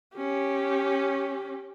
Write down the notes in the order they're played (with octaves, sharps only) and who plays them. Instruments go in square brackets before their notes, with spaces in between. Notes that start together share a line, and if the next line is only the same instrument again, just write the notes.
[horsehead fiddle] C#4 [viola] G4